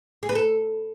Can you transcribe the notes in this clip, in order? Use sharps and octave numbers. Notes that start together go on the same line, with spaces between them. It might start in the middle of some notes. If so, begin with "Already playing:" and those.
G#4
B4
A4